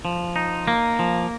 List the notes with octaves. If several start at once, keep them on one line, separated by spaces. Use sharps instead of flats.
F3
D#4
A#3
F3